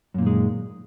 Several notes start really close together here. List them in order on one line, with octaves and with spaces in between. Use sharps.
F#2 A#2 D#3 G#3